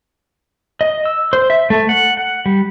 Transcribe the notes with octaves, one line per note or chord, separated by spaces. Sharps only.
D#5
E6
C5
E5
A3
F#5
F#5
G3